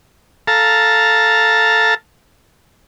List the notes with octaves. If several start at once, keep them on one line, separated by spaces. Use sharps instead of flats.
A4 F5 A5 A#5